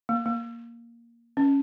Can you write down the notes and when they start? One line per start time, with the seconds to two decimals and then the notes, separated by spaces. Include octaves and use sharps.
0.09 A#3
0.26 A#3
1.37 C#4